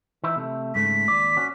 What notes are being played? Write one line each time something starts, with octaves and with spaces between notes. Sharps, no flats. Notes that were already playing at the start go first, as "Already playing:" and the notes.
E3 D#4 E4
C3 A3
G#2 C#3 A3 B6
D#2 D5
C#4 F#4